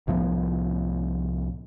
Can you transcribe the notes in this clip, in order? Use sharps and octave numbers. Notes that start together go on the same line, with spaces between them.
C2 A2 F3 B3